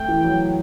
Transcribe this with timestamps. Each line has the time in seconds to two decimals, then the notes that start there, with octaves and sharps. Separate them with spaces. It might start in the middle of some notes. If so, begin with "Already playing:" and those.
Already playing: A3 G5
0.08 E3
0.24 F#3